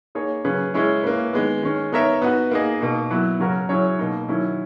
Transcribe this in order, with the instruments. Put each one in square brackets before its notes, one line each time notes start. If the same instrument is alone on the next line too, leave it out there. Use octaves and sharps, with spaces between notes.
[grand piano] A#3 D#4 G#4 C#5
C#3 F#3 C#4 G#4 B4
G#3 C#4 E4 G#4 C#5
A#3 C#4 E4 B4
D#3 G#3 B3
D#3 G#3 C#4
B3 D#4 A#4 C#5 E5
B3 D#4 F#4 B4
A#3 D#4 G#4 D#5
B2 A#3 D#4
F#3 B3 E4 B4
C#3 F#3 C#4 F#4 A#4
F#3 C#4 E4 G#4 C#5
B2 A#3 D#4
D#3 F#3 C#4 E4